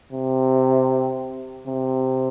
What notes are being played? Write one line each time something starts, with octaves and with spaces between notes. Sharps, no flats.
C3
C3